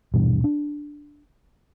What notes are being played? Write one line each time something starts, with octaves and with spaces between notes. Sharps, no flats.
D#1 G2 B2 E3
D4